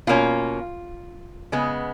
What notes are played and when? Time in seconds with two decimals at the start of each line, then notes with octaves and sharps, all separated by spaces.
0.07 B2 A#3 C#4 F4
1.52 C#3 G#3 B3